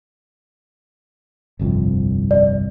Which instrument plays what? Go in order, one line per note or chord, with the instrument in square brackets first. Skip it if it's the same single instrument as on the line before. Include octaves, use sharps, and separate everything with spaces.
[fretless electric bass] G1 C2 F2
[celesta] D5